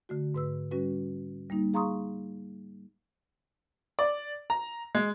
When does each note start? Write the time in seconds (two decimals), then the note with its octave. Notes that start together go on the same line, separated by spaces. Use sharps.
0.09 D3 A3 F#4
0.35 G#2 B4 E6
0.71 G3 C#4 F#4 B4
1.50 G3 A#3 D#4
1.74 G#4 F5 A#5 C6 C#6 D#6
3.99 D5
4.50 A#5
4.95 G#3